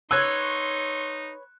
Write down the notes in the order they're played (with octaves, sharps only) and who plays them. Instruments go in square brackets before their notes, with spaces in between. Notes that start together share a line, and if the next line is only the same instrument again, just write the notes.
[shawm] D#4 [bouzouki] B4 C#5 [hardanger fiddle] C6 C#6 [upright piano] E6 F#6 G#6